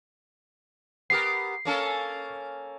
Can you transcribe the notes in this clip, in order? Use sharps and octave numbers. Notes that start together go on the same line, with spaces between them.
B3 G4 A#4 C7
A#3 C#4 A4